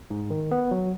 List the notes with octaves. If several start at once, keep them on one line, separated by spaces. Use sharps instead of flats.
G#2
D#3
B3
F#3